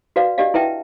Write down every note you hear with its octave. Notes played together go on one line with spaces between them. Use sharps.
F#4 B4 D5 F5
D4 G4 D5 D#5 F5
E4 B4 E5 G5 A5